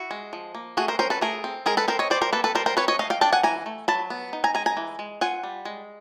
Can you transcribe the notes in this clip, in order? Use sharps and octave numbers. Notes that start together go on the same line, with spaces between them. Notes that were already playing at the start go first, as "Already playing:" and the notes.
Already playing: E4 F#4
G#3
F3
A#3
A3 F#4 G#4
A#4 C5
C#4 A#4 C5
A4 B4
A3 G#4 A#4
C4
G#3 G#4 A#4
A4 B4
C4 A#4 C5
C#5 D#5
G3 C5 D5
A#4 C5
A#3 A4 B4
A4 B4
G3 A#4 C5
A#4 C5
C4 B4 C#5
C#5 D#5
A3 D#5 F5
F5 G5
D4 G5 A5
F#5 G#5
E3 G#5 A#5
A3
F#3 A5 B5
B3
D#4
G#5 A#5
G#3 G#5 A#5
G#5 A#5
E3
G#3
F4 F#5 G#5
G3
G#3